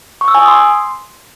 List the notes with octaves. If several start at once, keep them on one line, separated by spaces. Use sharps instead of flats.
C#6
E6
G#5
D#6
C6